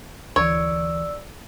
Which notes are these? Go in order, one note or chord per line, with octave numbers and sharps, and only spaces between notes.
D2 E3 C#5 D5 E6